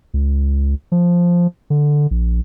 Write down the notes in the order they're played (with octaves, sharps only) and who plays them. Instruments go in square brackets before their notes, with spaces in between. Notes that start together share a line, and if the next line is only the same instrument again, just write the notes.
[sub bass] C#2
F3
D3
A#1